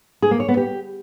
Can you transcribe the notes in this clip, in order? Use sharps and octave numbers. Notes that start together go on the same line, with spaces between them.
G#4
A#3
C#5
B3
G4